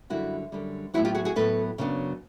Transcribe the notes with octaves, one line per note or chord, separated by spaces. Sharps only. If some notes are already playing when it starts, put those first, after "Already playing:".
F#2 D3 G3 E4 F#4
F#2 D3 G3
A2 F#3 B3 E4 F#4
F4 G4
F#4 G#4
F#4 G#4
A2 F#3 B3 A4 B4
F#2 C#3 F#3 B3 D4